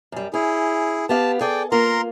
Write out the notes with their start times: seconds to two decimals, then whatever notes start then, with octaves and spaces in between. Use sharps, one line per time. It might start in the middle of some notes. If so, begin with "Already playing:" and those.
0.12 F#2 G3
0.34 C#4 E4 G#4
1.09 B3 G4 F5 A5
1.41 G#4 A4 D5 G5
1.72 A#3 F4 A#4 A#5 C6